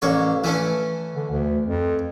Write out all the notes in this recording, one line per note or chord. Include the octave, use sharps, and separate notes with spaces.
A1 A#3 C#5
E3 A3 C#4
D3
D2
F2